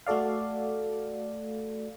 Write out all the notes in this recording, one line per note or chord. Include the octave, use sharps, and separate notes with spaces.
A3 F#4 A4 D5 F5